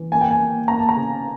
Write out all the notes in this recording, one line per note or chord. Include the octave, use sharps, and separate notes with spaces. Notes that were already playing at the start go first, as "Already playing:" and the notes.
Already playing: E3
A#3 G#5
G5
G#5
A#3
A#3 A#5
A5
A#5
C#3